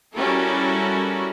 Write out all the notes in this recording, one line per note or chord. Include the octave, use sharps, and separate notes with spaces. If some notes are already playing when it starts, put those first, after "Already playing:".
G3 C#4 E4 F#4 A4 A#4